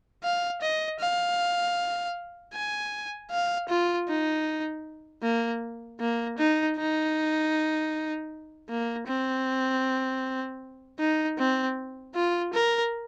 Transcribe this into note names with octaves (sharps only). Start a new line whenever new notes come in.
F5
D#5
F5
G#5
F5
F4
D#4
A#3
A#3
D#4
D#4
A#3
C4
D#4
C4
F4
A#4